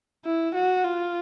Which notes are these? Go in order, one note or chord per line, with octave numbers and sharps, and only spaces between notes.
E4
F#4
F4